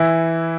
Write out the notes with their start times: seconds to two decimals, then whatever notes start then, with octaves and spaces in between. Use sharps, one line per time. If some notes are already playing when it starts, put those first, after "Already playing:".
Already playing: E3 E4